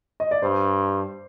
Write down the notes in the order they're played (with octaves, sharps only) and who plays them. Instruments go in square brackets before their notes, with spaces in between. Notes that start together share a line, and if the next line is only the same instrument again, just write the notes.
[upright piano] D#5
D5
[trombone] G2 [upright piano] C5